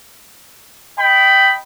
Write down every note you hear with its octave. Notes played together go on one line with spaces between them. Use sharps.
D#5 G5 B5